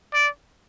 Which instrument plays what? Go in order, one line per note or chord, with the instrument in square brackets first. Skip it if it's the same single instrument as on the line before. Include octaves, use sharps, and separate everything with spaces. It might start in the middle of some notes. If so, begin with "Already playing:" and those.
[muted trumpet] D5